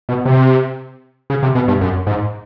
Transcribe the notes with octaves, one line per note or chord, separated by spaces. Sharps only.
B2
C3
C#3
C3
B2
G2
F#2
G#2